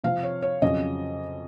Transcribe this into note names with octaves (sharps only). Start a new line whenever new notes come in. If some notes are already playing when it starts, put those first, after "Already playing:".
C3 F3 C4 F5
C#5
C#5
F2 C#3 F#3 C#4 D#5